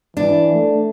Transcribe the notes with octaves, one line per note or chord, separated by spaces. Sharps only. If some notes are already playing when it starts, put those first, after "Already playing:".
E3 D4
A3